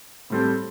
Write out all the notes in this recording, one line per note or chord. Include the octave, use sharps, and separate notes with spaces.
A2 G3 C4 A4 C5